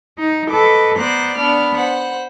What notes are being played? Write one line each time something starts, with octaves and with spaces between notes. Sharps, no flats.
D#4
A4 B4 D#5 D6
B3 C5 D5 A#5 F#6
B3 D4 B5 F6
C5 F#5 B5